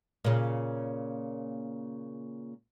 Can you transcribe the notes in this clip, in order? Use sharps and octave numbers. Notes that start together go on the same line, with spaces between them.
A#2 C#3